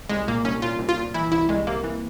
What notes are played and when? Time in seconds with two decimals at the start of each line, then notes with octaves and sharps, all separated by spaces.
0.09 C2 G#3
0.28 A#2 A#3
0.45 C2 C#4
0.62 A#2 F4
0.79 C2
0.89 F4
0.97 A#2
1.14 E3 E4
1.32 C2 E4
1.49 C2 G#3
1.67 C3 A#3
1.84 E3